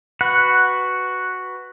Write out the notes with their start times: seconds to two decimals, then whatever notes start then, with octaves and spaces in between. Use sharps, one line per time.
0.21 F#4 B4 F#5